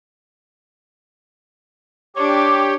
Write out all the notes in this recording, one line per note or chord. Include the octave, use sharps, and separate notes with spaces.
D4 G4 C#5 D6